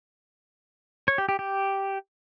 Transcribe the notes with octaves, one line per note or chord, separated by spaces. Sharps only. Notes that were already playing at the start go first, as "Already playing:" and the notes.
C#5
G4
G4
G4